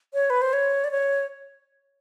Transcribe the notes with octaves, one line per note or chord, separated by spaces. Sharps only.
C#5
B4
C5
C#5
D5
C#5